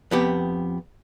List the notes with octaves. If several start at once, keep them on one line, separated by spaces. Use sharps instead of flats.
F2 B3 G4